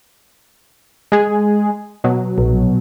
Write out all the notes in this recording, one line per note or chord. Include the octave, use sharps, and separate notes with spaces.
G#3 G#4
B2 F#3
A#1